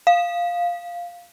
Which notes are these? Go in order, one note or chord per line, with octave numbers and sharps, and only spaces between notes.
F5